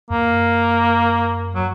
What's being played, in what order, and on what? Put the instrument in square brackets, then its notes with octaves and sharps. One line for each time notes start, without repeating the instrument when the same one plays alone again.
[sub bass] F#2 [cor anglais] A#3
[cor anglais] F#3